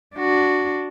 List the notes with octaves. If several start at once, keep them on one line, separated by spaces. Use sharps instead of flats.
D4 F#4